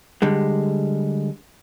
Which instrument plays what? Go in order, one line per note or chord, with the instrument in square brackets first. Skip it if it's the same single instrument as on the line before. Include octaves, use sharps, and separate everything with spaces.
[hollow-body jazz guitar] D3 G3 G#3